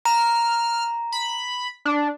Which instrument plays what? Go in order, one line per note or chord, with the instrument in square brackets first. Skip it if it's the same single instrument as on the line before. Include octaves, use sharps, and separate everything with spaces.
[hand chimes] A#5 [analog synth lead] F6
[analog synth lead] B5
D4